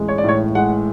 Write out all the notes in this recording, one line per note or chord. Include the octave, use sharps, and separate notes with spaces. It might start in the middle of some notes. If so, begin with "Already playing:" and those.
Already playing: A1 G#3
C#5
D5
A2 C#5
G#3 F#5